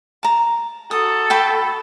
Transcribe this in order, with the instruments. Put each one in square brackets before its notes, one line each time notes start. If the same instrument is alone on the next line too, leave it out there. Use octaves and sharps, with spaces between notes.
[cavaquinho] A5 A#5
[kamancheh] F#4 A4 [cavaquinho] D#6
[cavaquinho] G5 A5 B5